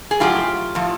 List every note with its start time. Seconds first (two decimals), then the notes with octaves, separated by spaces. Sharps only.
0.11 G#4
0.20 A2 F#3 F4 G4
0.75 A2 F3